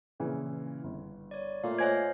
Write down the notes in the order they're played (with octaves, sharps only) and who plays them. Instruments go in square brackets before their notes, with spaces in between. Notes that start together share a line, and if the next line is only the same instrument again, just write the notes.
[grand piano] A#2 C#3 E3
G1
[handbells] C#5 D5
[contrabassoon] A#2 [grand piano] A3 [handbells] F5
[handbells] C5 D#5 F5 [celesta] C#5 G#5 G#6